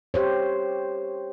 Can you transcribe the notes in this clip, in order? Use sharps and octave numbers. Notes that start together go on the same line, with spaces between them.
G4 C5 C#5